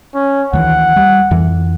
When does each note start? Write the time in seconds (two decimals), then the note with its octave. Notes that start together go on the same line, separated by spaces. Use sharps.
0.15 C#4
0.53 D2 D#3 E3 F#5
0.96 G3
1.31 F2 E3